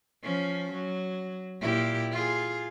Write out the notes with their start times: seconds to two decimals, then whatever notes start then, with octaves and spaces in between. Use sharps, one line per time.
0.23 F3 C#4
0.72 F#3
1.60 A#2 E4 G4
2.11 F4 G#4